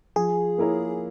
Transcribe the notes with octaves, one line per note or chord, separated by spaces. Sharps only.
F3 G#4
A#3 E4 A#4 C#5